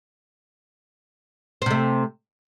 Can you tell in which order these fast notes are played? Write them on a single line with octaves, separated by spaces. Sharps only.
C4 C3 A3